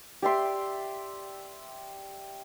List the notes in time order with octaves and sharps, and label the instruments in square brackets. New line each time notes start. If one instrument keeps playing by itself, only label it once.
[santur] G4 D5 E5 C6